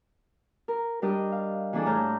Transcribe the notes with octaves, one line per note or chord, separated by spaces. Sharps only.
A#4
G3 D4 G4 A#4 D#5
F5
E3 A#3 D4 G#4 A4
A2 A5 A#5 F6 G6